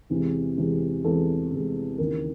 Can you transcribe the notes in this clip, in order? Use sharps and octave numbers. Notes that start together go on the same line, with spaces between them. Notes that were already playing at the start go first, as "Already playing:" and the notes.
E2 C3 E3 G#3
E2 C3 E3 G#3
E2 C3 E3 G#3 A4
E2 C3 E3 G#3
D#2 C#3 E3 A#4